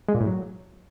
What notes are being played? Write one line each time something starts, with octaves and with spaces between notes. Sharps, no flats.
G#3
A#2
A2
F#3